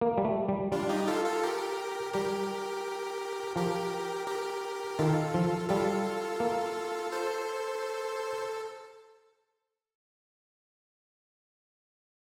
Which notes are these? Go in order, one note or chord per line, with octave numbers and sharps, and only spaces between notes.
A#3
G3
A3
G3
G3 D4 F4
D#4 G4
F4 A4
F4 A4
G4 A#4
G3 G4 A#4
F3 G4 A#4
G4 A#4
D#3 F4 A4
F3
G3 F4 A4
A#3
A4 C5